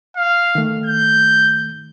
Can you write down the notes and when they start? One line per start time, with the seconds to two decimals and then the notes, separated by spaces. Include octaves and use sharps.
0.17 F5
0.55 D#3 A3
0.86 G6